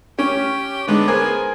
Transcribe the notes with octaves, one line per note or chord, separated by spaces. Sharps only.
C#4 G4
D3 G#3 B3 D4 D#4
G#4 A#4 C5 G#5